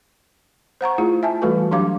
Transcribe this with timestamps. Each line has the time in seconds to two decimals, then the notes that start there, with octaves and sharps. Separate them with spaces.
0.81 C5 F#5 A#5 C#6
0.98 A3 E4 F4 G#4
1.23 E5 G#5 A5
1.42 E3 G3 A3 F#4 A4 B4
1.71 F#3 D4 G4 F5 D6